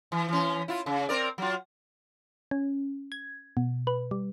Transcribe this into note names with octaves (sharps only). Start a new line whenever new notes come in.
E3
E3 C#4
E4 F4
C#3
C4 A#4 D5
F#3 F4
C#4
G#6
B2
B4
G3